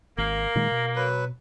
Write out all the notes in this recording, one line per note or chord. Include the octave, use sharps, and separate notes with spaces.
G#1 A#3 A#4
A#2 D#3 G#3
B2
F#3 B4